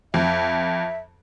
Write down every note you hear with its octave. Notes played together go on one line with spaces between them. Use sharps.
F2 E5